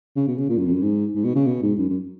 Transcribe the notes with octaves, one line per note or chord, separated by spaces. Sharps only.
C#3
B2
C#3
A#2
F#2
F2
F#2
G#2
G#2
B2
C#3
B2
G#2
F#2
F#2